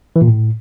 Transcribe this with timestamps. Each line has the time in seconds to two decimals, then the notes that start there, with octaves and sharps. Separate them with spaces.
0.16 E3
0.22 A#2
0.27 A2